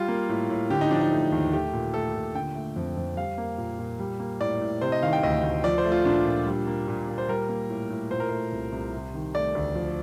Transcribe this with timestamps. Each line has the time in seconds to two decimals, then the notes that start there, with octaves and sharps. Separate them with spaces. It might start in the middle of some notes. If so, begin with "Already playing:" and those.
Already playing: G3 F4
0.08 A#3
0.29 A2
0.50 A2
0.70 D3 G4
0.81 D#4
0.91 F3 D4
1.01 D#4
1.12 A3
1.32 D#2
1.53 A3 G4
1.73 A#2
1.94 A3 A4
2.14 A#2
2.35 D3 G5
2.55 A3
2.76 F2
2.97 F2
3.17 G3 F5
3.38 A#3
3.58 A#2
3.79 A#2
3.99 G3
4.20 A#3
4.41 A2 D5
4.61 A2
4.81 C3 C5
4.92 D#5
5.02 D#3 F5
5.13 G5
5.23 D2 D#5
5.43 D2
5.64 F3 D5
5.78 C5
5.85 A3
5.91 F4
6.05 A#2 D4
6.25 A#2
6.46 G3
6.67 A#3
6.88 A#2
7.09 A#2
7.18 C5
7.29 G3 A#4
7.49 A#3
7.70 A2
7.90 A2
8.11 A#2 C5
8.20 A#4
8.29 A3 C5
8.52 C2
8.72 C2
8.93 C3
9.14 D#3
9.34 A3 D5
9.55 D2
9.75 F3